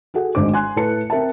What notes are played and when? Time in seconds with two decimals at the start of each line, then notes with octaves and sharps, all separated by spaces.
0.14 F#4 G#4 A4 F#5
0.35 G#1 A2 G#3 D4 C5 D6
0.54 G#5 C6 F#6
0.76 A2 E4 A4 B4 A5 C#7
1.10 C4 A#4 E5 A5